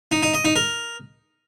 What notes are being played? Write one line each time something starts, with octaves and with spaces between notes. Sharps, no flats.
D#4
D#4
D#5
D#4
A#4